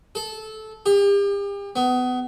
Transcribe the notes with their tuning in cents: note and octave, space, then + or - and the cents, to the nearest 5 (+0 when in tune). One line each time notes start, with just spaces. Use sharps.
A4 -15
G4 +40
B3 +25